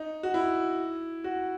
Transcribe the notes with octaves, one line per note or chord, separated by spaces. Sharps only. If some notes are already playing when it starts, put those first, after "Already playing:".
Already playing: D#4
F#4
E4
F#4